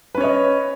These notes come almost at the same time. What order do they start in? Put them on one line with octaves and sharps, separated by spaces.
B4 C#4 C#5 D#5